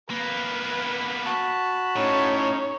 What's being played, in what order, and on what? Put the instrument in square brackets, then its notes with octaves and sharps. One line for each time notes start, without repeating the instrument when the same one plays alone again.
[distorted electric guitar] A#3 B3 [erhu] B4
[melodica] F#4 A5 B5
[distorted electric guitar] A2 [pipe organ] C#4 D#4 [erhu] C#5